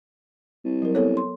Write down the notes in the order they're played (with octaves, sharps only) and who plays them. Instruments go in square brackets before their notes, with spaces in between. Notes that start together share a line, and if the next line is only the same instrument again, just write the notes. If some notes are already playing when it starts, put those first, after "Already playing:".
[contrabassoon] C2
[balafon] F#3 A#4
B3 A4 C#5
C6